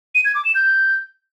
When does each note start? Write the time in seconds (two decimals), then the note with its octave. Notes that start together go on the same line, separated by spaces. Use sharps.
0.15 D#7
0.25 G#6
0.35 D6
0.45 E7
0.55 G6